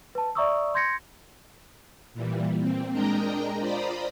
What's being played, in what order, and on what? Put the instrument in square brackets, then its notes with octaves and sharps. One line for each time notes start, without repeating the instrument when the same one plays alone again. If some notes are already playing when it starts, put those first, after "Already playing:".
[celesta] B4 A5
D5 E5 A#5 C#6 D#6 E6
C6 G6 G#6 A#6 C#7
[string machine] A#2 E3 G3
A#2 C4
G#3 D4 A#4 D#5 G5 A#5
F4 C5 D5 A#5 B5 D#6